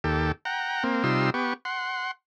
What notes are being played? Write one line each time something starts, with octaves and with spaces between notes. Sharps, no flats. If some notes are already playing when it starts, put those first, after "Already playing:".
D#2 G4 A4
F#5 G5 A#5
A#3 C4
C3 G3 D#4 F4 C6 E6
B3 G4 C#6
F#5 C6